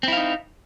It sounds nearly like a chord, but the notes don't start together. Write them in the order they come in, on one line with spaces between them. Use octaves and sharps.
C4 E4 F5 D#4